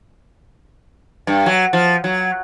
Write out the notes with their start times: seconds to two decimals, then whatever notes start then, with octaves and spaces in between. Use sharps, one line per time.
1.27 G2
1.46 F#3
1.73 F3
2.04 F#3